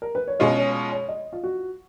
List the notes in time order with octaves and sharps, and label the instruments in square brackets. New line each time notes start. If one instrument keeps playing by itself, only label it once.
[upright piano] A#4
B4
C#5
[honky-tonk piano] B2 G#3 C#4 F4 [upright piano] D#5
[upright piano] C#5
C#5
C#5
D#5
F4
F#4